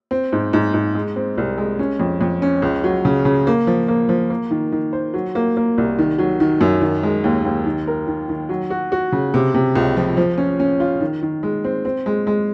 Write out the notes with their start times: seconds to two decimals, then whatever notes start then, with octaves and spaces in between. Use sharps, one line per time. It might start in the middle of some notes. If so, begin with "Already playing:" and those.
0.11 C4
0.33 G#2
0.53 G#2
0.74 G#2
0.95 G#3
1.16 C4
1.38 C2
1.58 G#3
1.79 C#4
2.00 F2
2.21 F2
2.42 C#4
2.62 C#2
2.84 F#3
3.05 C#3
3.25 C#3
3.47 A#3
3.67 F3
3.88 A#3
4.09 F3
4.30 A#3
4.51 D#3
4.72 D#3
4.93 C5
5.14 F#3
5.35 A#3
5.57 A#3
5.78 C2
5.99 D#3
6.18 F#3
6.40 D#3
6.61 F#2
6.81 D#3
7.03 G#3
7.24 D#2
7.45 D#2
7.66 D#3
7.87 A#4
8.08 D#3
8.29 D#3
8.49 F#3
8.70 F#4
8.92 F#4
9.12 C#3
9.34 C3
9.54 C3
9.76 C#2
9.97 F3
10.17 F3
10.38 C#4
10.60 C#4
10.80 F4
11.01 D#3
11.23 D#3
11.43 G#3
11.64 C4
11.85 C4
12.06 G#3
12.27 G#3